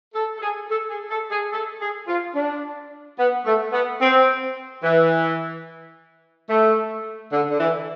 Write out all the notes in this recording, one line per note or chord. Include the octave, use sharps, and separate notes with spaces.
A4
A4
G#4
A4
G#4
A4
G#4
A4
G#4
F4
D4
B3
A3
B3
C4
E3
A3
D3
D3
E3